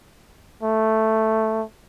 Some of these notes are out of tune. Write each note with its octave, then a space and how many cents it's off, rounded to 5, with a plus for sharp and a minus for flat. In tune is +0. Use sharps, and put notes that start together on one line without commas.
A3 +0